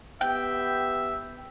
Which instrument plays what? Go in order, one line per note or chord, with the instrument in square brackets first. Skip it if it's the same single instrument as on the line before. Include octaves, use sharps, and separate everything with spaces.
[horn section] B3 G4 E5 [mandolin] G5